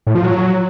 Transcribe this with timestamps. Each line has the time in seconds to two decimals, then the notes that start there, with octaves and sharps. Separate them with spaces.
0.07 A2
0.15 F3
0.23 F#3